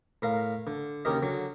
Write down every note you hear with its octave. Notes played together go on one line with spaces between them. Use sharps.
A2 A#4 F5
D3
D#2 C#3 G4 A#4 D#5
D3 F#3